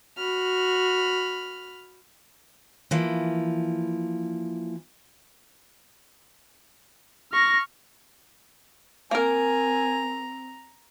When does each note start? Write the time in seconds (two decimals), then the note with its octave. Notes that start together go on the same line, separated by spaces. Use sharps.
0.16 F#4 B5 F6
2.91 E3 F3 A#3
7.32 C#6 F6 A#6
9.11 A#3 C4 A#4 G#5 A#5